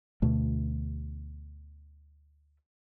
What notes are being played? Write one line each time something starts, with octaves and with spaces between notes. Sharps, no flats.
D2 B2 D3 A3